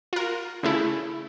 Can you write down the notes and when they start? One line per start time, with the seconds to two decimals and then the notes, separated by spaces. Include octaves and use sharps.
0.13 F4 A#4
0.63 C#3 A3 E4